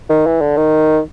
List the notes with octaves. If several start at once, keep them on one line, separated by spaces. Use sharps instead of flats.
D#3
E3
D3
D#3